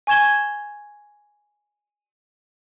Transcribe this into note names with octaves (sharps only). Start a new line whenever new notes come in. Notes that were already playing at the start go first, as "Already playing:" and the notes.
G#5 C#6 G#6 E7 G7